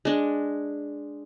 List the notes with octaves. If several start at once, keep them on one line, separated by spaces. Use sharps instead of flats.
G#3 D4